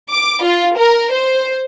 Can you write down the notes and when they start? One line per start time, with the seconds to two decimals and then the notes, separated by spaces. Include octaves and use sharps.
0.11 D6
0.43 F4
0.78 A#4
1.12 C5